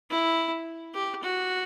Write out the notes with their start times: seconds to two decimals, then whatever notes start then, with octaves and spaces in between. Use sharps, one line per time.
0.10 E4
0.94 G4
1.22 F#4